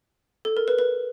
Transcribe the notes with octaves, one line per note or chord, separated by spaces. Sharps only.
A4
A#4
B4
B4